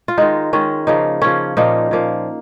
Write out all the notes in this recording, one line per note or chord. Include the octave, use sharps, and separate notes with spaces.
F4
D#3 G#3 D#4
D#3 G#3 C#4
C#3 F3 A#3 D#4
C#3 F3 A#3 C#4
A#2 F3 A#3 D#4
A#2 F3 A#3